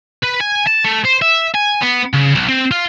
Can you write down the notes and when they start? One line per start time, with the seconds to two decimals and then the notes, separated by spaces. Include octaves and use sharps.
0.23 B4
0.40 G#5
0.67 A5
0.85 A3
1.05 C5
1.22 E5
1.54 G#5
1.81 B3
2.13 C#3
2.35 B1
2.49 C4
2.71 F4